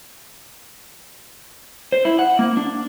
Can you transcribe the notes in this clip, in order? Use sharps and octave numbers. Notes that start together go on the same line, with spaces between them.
C5
E4
F#5
A#3
D4